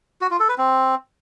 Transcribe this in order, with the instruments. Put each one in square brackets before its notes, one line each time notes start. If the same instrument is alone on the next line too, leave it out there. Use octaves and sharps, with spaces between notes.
[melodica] F#4
F4
A4
B4
C4